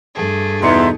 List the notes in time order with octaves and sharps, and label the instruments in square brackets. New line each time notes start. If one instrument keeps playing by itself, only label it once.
[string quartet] G2 A3 G#4
[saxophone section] E2 [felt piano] B2 D#4 C#7 [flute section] E5 A#5 C6